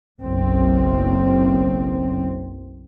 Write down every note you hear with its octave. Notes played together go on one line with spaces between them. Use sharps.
F#1 B1 F#2 C4